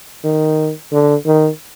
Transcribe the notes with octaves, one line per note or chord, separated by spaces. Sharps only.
D#3
D3
D#3